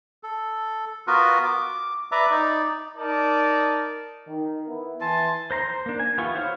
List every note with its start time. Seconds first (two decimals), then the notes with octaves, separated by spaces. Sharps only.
0.23 A4
1.07 B3 F4 F#4 A#4 B4
1.45 D6
2.12 B4 D5 E5 A#5 D6
2.31 D#4 D5
2.96 D#4 A#4 D5 A5
4.28 D#3
4.68 B3 E4
5.01 E3 G#5 A5 C6
5.51 C5 A#5 C6
5.69 C5
5.86 A#3 D4
5.99 G#5
6.18 E3 B3 F4 G4 C#6
6.35 E4 F#4 C5 C#5 F5